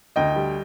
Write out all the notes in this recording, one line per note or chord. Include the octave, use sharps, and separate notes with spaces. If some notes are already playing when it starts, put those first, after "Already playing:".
D2 D#5 G5
G3